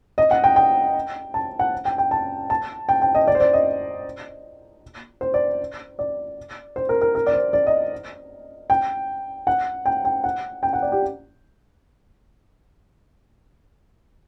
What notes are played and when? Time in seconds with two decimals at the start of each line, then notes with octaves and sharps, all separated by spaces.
0.18 D#5
0.31 F#5
0.44 G5
0.56 G5
1.34 A5
1.59 F#5
1.85 G5
1.98 G5
2.11 A5
2.50 A5
2.89 G5
3.02 G5
3.15 D#5
3.27 D5
3.35 C5
3.40 D5
3.53 D#5
5.21 C5
5.34 D5
5.99 D5
6.76 C5
6.89 A#4
7.02 A#4
7.15 A#4
7.26 D5
7.34 C5
7.53 D5
7.67 D#5
8.70 G5
9.47 F#5
9.86 G5
10.05 G5
10.24 F#5
10.63 G5
10.73 F#5
10.82 D5
10.92 G4